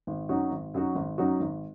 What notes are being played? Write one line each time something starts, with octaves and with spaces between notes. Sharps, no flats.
G#1
F#2 F#3 D#4 F#4
G#1
F#2 F#3 D#4 F#4
G#1
F#2 F#3 D#4 F#4
G#1